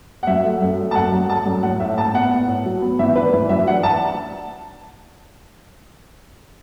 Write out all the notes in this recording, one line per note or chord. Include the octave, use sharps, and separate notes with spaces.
F#5
F#2 E5
A3
F#2
A3
A5
F#2 F#5
F#2
A3 A5
F#2
A2 F#5
A2 E5
A2 A5
B3 F#5
A2
A2
F#3
B3
E3 E5
D4 B4
E3 B4
F#2 E5
D4 F#5
A5